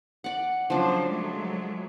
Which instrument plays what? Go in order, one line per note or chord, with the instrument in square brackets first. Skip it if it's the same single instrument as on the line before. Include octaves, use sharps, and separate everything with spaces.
[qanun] D5 F#5
[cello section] C#3 F#3 C5 [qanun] F3 D4
[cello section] F#3 G#3 A3